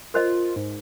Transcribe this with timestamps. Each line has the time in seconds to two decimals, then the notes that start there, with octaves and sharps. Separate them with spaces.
0.14 F4 A#4 C5 D#5
0.56 G#2